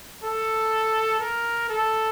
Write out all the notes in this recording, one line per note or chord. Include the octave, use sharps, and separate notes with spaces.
A4
A#4
A4